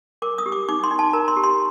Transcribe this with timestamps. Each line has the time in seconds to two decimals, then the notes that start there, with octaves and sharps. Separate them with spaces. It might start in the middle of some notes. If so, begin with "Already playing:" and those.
0.22 A#4 D6
0.38 D#6
0.46 G4
0.52 D6
0.69 D#4 D6
0.84 C6
0.91 D#4
0.99 A5
1.13 A#4 A#5
1.28 C6
1.37 G4
1.44 C6